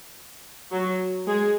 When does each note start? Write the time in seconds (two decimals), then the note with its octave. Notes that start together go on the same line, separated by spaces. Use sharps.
0.71 F#3 F#4
1.27 G#3 G#4